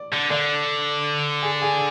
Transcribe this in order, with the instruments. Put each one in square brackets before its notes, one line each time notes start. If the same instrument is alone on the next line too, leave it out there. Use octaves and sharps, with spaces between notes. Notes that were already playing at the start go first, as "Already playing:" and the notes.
Already playing: [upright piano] D5
[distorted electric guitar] D3
[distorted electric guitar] D3 [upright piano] D5
[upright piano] G#4
G#4